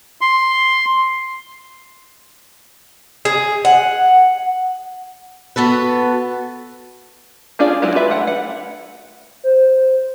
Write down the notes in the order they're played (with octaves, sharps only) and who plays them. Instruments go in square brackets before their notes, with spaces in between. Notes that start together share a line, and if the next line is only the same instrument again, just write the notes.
[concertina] C6
[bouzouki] G#4
F#5
[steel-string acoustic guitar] B3 F#4 A4 B4
[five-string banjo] C#4 D4 F4 G#4 D5
F#3 G#3 E4 F#4 G4
F4 B4 E5 B5
A3 F#5 G5
F#5
[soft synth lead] C5